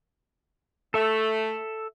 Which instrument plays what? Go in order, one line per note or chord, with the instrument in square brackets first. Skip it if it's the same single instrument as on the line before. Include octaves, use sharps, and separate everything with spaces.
[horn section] A3 [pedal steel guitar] A4 E5